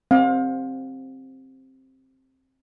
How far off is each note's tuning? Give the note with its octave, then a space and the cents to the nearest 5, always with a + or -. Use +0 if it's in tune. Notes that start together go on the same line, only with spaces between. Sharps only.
C4 +15 F5 +40